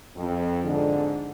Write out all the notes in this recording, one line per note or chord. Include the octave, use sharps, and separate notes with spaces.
F2
G#2 D3